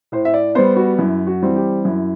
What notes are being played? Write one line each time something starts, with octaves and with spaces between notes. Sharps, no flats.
A2 C5
E5
D5
G3 B3 C5
F#4
F#2 E4
F#4
E3 G3 C4
G4
F#2 E4